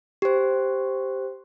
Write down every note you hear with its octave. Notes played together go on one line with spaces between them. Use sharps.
G4 C5